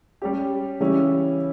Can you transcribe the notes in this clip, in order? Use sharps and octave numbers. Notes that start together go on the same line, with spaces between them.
G3 C#4 G4
C#3 E3 G3 C#4 E4